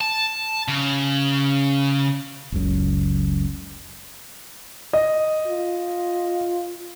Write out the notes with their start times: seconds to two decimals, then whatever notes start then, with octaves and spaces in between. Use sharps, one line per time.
0.01 A5
0.68 C#3
2.52 F#1 C#2 F#2
4.93 D#5
5.47 F4